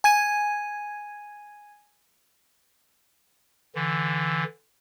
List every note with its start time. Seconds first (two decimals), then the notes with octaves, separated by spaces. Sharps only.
0.04 G#5 G#6 D#7
3.75 D3 E3